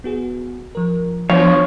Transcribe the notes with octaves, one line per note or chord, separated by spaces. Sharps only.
B3 F#4 G#4
F3 A#4
F3 B3 D4 C#5